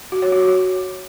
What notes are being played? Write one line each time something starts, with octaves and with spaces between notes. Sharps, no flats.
F#4
C#5
F#4
F#4